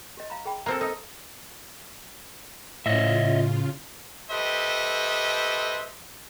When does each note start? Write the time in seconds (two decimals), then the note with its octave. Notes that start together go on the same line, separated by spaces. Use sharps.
0.17 G4 D#5
0.30 F5 A#5 B5
0.45 G#4 G5 B5
0.66 A#3 C4 A4 A#5 F6
0.81 D#4 A4 D#5
2.86 A2 C#3 F4 C#5 D#5 E5
4.30 G4 A4 B4 C5 D#5 E5